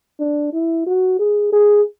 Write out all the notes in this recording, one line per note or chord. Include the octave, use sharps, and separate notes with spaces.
D4
E4
F#4
G#4
G#4